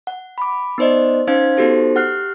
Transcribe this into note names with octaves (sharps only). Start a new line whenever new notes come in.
F#5
B5 D6
B3 D#4 C5 D5 D#5
C#4 D#4 C5 F5 G#6
B3 D#4 F#4 G4 A4 C5
G4 F#5 F6 F#6 C7